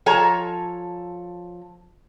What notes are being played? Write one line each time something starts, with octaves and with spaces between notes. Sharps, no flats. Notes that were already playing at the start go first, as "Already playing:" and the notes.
F3 A4 C#5 G#5 A#5